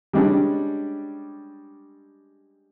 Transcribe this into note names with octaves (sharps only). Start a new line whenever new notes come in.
G3 G#3 C#4 D4